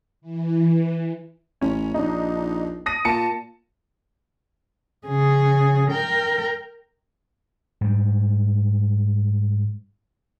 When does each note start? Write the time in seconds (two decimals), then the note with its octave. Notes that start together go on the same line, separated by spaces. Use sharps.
0.21 E3
1.61 A1 C#4
1.94 A#1 D4 D#4
2.86 D#6 A#6 D#7
3.05 A#2 A5 C#7
5.07 C#3 G#4
5.90 A#4 G5
7.81 G#2 G3